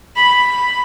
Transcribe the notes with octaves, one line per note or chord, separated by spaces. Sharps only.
B5